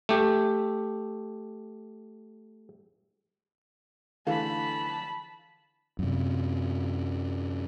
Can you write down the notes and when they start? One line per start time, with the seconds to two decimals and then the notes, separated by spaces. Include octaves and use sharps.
0.09 A3 G4
4.27 D3 E3 A3 F5 A5 B5
5.99 F#2 C3